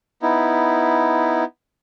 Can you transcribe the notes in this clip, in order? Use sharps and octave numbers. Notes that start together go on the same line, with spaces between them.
B3 D#4 E4